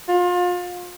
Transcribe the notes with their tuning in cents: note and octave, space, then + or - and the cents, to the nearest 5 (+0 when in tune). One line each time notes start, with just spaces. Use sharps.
F4 +30